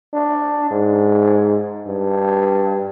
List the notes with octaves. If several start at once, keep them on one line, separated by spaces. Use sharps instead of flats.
D4
G#2
G2